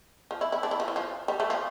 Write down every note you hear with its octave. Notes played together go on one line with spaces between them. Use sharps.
F3
E4
E4
D4
E4
F3
E3
F3
G3
A3
F3